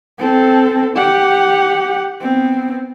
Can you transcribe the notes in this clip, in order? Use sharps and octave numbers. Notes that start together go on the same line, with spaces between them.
C4 A4
G4 F#5
B3 C4